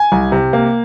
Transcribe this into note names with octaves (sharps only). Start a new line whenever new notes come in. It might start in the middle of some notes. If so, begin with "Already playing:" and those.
Already playing: G#5
C2
C3
A#3